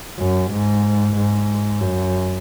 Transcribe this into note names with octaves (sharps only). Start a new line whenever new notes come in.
F#2
G#2
G#2
F#2